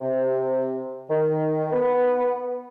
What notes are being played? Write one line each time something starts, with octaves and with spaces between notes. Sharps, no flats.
C3
D#3
B3